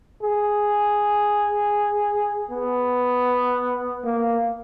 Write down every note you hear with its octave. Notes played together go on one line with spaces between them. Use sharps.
G#4
B3
A#3